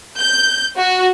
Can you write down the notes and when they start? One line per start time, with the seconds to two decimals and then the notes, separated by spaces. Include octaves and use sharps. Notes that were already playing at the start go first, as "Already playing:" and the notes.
0.18 G6
0.77 F#4